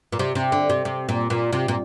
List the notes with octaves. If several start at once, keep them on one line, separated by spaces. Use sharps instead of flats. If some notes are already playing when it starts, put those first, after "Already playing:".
A#2
C3
C3
D3
C3
C3
A#2
A#2
C3
A#2